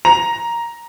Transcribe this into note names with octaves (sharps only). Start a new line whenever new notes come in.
A#5 F7